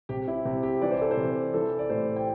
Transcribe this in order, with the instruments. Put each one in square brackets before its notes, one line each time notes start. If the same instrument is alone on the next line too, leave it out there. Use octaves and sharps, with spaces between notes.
[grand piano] C3 G4
E4
C3 G4
G4
E3 D5
C5
A4
C5
C3
E3 A4
D5
A2 C5
G5